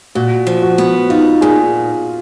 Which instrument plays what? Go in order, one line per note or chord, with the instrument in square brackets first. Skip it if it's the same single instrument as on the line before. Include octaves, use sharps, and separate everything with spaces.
[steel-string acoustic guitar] A#2 [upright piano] F#4
[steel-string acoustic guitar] F3
[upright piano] F#4
[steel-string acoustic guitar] B3
[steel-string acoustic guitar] D#4 [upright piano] F4
[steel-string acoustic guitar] A#2 [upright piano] G#4